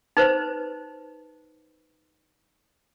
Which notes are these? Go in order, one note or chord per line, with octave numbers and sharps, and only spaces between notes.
D#4 B4 C5